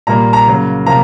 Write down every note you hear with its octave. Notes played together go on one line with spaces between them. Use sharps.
A#2 G3 A#3 A#5
A#5
C#3 F#3 A#3
C3 F3 A#3 A#5